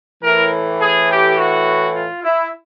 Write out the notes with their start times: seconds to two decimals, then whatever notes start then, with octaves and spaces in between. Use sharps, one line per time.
0.22 A2 E3 A#4
0.80 G#4
1.09 G4
1.36 F#4
1.94 F4
2.23 E4